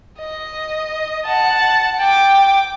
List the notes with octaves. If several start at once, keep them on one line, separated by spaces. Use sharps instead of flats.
D#5
F#5 A5
G5 D6